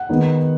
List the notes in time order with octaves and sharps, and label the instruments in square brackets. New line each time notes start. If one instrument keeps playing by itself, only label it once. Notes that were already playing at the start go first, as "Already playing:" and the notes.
Already playing: [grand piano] F#5
D#3 G#3 B3